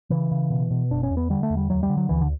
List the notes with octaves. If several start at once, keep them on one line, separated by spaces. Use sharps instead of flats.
C#3 E3
C#3
B2
B2
F#1 D4
C#4
E2
B3
D3 G3
A3
E2
G3
D2 F#3
G3
D3
F#3
D2 E3
D3